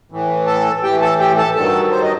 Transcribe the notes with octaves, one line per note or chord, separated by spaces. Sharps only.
A2 E3
A4 A5
A2 E3 G4 G5
A4 A5
G4 G5
A4 A5
G2 D#3 F#3 A4 A5
C5
D#5